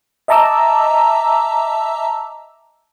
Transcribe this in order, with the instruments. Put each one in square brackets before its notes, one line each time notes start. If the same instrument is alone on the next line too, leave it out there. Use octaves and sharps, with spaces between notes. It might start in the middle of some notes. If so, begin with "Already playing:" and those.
[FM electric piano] D#5 E5 A5 A#5 D6 E6